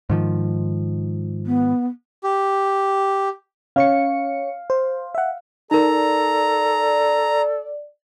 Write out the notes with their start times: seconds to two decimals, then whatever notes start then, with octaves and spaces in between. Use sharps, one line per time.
0.10 G#2 D#3 F3
1.46 B3
2.24 G4
3.76 C#4 C#5 F5 C#7
4.70 C5
5.15 E5 F#5
5.71 D#4 A4 A#4 D5 A#5